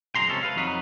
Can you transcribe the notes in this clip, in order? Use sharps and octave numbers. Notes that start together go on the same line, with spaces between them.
F#2 G#3 A#5 C6
C#2 C3 C#4 A4
B4 F5
F2 F#3 D#4 B4